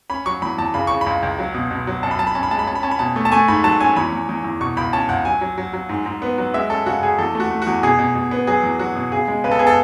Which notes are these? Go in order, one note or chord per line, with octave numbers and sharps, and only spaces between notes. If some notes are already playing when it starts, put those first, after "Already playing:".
C#4 B5
F#3 C#6
E2 B5
E2 A5
C#3 B5
C#3 C#6
B5
C#2
C#2
F#3
B2
B2
F#3
F#2 A5
B5
F#2 A5
B5
C#4 A5
B5
G#3 A5
B5
C#4 A5
B5
C#4 A5
B5
B2 A5
A3
A5
A3 G#5
G#2 B5
F#3 A5
C#4 G#5
E2 B5
E2
E2
E2
B2 C#6
C#2 B5
C#4 A5
C#2 F#5
F#3 G#5
F#3
F#3
F#3
G#2
G#2
B3
F#3
G#3 E5
C#4 A4
C#3 F#4
C#3 G#4
E2 A4
A3 F#4
A3
F#4
E2
B2 G#4
B2
B2
B3
F#3 G#4
E2
F#3 F#4
B2
C#3 G#4
G#3
C#3 B4
A4
B3 G#4
A4